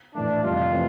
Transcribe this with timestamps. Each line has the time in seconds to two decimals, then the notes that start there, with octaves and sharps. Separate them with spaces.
0.14 A2 E3 A3 D4
0.44 F2 C3 G3 F4
0.72 C3 E3 A3 C4